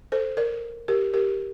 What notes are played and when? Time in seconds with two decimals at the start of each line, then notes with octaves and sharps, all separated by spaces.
0.12 A4 C5
0.37 A#4 D5
0.88 G4 A#4
1.14 G4 A#4